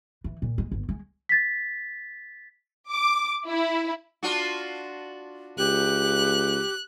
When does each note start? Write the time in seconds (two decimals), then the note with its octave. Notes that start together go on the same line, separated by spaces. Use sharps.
0.24 E3
0.42 A#2
0.58 G#3
0.72 G1
0.89 G#3
1.29 A6 B6
2.91 D6
3.47 E4
4.23 D4 F4 F#4
5.58 C#2 G4 F#6